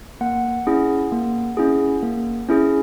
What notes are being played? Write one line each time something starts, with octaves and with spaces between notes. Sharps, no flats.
A#3 F#5
C#4 E4 G#4
A#3
C#4 E4 G#4
A#3
C#4 E4 G#4